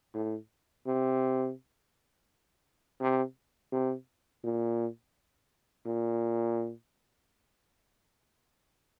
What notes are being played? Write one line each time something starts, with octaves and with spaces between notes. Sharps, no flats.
A2
C3
C3
C3
A#2
A#2